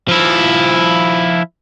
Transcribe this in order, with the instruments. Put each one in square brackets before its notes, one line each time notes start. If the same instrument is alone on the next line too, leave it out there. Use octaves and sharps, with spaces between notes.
[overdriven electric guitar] F3 E4